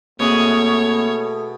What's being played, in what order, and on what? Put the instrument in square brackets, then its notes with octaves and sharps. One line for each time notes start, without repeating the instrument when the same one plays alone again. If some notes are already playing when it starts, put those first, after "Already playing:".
[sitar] B2 G#4 [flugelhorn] A3 [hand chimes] A#3 C4 E5 [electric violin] C#5